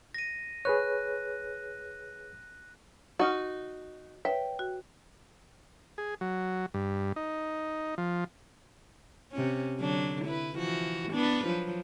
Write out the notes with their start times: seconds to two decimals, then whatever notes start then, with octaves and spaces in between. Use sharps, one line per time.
0.14 A#6 D#7
0.65 G#4 B4 C#5 F#6
3.19 D#4 F#4 C#6 F6
4.25 B4 C#5 E5 G5
4.59 F#4
5.98 G#4
6.21 F#3
6.74 G2
7.16 D#4
7.98 F3
9.32 C3 C#4
9.78 D3 F#3 D4
10.25 E4 B4
10.57 E3 F3 F#4
11.11 B3 D4 B4
11.47 F3 F#3